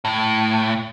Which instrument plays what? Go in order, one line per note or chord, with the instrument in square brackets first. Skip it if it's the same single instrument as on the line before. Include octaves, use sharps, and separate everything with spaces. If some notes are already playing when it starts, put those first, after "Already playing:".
[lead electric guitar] A2